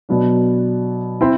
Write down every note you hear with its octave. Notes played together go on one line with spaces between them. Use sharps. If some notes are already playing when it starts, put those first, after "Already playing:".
B2 F#3 B3 D4
C4 E4